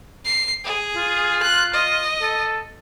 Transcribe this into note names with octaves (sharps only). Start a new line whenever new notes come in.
C7
G#4
F4
F#6
D#5
A4